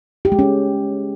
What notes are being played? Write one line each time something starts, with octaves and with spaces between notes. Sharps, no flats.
G4
G#3
C#4